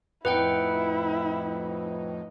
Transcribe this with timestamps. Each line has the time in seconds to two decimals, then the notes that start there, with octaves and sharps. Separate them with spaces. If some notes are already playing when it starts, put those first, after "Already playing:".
0.25 F2 A2 D#4 E4 B4 F#5 G5